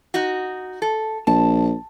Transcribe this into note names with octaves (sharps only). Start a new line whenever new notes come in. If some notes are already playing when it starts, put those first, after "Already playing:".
D#4 F#4
A4
A#1 A5